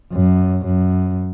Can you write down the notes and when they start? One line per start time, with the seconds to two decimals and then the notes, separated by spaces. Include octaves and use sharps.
0.13 F#2
0.66 F#2